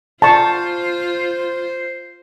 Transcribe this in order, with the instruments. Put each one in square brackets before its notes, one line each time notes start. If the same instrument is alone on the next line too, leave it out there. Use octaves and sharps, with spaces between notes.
[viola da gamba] F4 [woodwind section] C5 [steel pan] A5 C#6